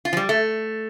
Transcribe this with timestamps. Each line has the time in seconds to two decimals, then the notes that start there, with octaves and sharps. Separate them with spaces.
0.05 F4
0.13 F3
0.17 G3
0.29 A3